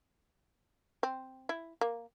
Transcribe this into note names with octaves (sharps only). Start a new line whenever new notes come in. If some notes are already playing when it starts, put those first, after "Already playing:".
C4
E4
A#3